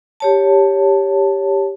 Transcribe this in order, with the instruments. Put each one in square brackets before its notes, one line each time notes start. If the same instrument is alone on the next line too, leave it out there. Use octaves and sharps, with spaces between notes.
[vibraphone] G4 C#5 A5